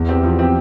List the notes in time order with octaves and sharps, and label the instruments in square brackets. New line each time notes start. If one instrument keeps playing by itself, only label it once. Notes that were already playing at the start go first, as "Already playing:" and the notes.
Already playing: [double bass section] E2
[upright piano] C4 G4
F3
C4 G4